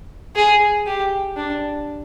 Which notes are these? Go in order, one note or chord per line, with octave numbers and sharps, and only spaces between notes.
G#4
G4
D4